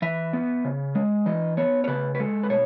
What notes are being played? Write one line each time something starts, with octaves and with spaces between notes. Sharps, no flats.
E3 E5
B3
C#3
G#3
E3 D#5
B3 C#5
C#5
C#3 B4
B4
G#3 A4
B4
B2 C#5